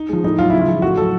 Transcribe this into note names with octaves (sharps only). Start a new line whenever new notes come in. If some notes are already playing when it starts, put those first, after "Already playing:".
Already playing: D#4
F3 G#3
A2 D#4
F#3 F4
C#3 E4
F4
F3 G#3
A2 F#4
F#3 A4